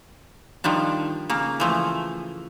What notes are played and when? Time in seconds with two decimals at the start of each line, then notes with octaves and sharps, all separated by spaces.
0.64 D#3 F3 G3 D4
1.30 C#3 A#3
1.60 E3 F3 A3